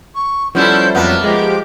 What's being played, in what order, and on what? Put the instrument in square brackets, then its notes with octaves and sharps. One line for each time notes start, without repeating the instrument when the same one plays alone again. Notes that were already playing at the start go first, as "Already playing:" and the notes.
[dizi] C#6
[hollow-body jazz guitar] F3 G3 [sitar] B3 C#4 E4 [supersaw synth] A4 C5 [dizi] G6
[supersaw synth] F2 F#3 A5 [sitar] A#3 B3 [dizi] B4
[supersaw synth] F3 G4 [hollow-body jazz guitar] G#3 [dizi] D6